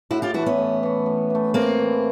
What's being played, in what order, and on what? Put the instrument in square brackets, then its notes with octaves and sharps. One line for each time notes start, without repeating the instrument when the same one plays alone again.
[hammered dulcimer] A2 [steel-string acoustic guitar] E4 F#4
[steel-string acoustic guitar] F4 G4
[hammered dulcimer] E3 A3 [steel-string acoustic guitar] E4 F#4
[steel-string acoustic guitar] B3 C#4
[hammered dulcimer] A2
E3 A3
A2
E3 A3
[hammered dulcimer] A2 [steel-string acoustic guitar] A#3 C4
[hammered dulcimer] E3 A3